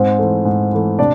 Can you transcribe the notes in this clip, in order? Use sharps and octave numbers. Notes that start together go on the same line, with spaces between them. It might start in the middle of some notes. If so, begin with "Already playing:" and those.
Already playing: G#2 C4 C5
E3 A3
G#2
E3 A3
C3 D4 D5